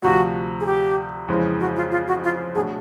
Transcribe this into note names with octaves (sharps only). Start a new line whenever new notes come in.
D2 C3 F3 F#4
G#4
G4
F2 C#3 E3 G#3 C4
F#4
F4
F4
F#4
F4
B2 F#3 A3 D4 G#4